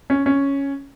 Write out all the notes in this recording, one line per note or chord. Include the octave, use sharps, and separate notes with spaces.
C#4
C#4